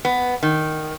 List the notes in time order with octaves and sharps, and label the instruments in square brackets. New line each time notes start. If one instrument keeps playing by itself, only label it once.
[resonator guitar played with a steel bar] B3
D#3